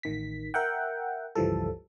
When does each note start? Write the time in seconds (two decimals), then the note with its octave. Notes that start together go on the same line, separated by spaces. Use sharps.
0.03 A1 D#3 B6
0.54 A#4 E5 F#5 G5
1.35 G1 C#2 E3 F3 G3 A4